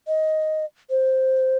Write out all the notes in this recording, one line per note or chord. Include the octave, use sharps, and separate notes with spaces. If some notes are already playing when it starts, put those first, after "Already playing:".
D#5
C5